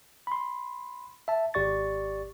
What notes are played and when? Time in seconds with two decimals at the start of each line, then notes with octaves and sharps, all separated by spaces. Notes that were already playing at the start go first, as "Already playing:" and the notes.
0.27 B5 C6
1.28 E5 A5
1.54 G#1 G4 D5 C#6 A6